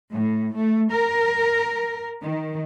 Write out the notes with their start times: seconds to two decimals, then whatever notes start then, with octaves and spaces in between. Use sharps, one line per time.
0.12 A2
0.57 A3
0.92 A#4
2.22 D#3